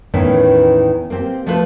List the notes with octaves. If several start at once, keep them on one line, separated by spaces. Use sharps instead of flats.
E2 A2 D#3 E3 B3 C#4
A#3 C4 G4
F3 A3 F4 A4 B4 C5